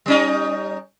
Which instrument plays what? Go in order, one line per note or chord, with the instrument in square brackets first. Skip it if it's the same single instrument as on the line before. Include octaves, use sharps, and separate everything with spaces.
[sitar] G3 C#4 D#4